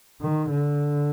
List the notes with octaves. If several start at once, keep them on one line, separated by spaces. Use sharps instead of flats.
D#3
D3